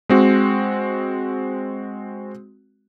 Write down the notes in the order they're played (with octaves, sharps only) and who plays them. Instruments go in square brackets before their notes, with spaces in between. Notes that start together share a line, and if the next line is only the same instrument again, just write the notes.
[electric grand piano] G#3 C4 F#4